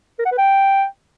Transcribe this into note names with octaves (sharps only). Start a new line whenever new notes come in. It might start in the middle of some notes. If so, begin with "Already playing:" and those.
A#4
F#5
B4
G5